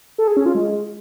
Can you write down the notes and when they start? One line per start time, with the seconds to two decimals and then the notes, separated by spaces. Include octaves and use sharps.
0.18 A4
0.28 G#4
0.37 C#4
0.46 F4
0.55 G#3